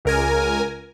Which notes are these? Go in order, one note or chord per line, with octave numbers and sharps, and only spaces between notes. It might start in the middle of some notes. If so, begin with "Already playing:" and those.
C#2 A#4 G#5